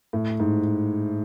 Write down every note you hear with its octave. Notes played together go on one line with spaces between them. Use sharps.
A2
G#2